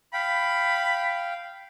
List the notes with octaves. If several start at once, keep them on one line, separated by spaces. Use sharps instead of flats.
F5 G5 B5